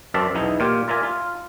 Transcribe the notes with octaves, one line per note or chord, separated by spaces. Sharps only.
F#2 C4 D5 E5 A5
B1 E2 B3 D#4 E4
A#2 F4 G4
F4 A#4 D5 E5 G#5
F4